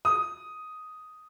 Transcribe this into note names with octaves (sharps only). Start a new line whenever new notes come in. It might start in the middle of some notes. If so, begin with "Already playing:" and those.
D#6